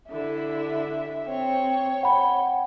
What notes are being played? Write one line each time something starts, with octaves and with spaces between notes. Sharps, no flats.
D3 E4 E5
C4 C#5
F#5 G5 B5